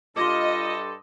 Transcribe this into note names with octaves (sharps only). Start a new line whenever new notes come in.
G2 F4 A4 D#5 C6 D6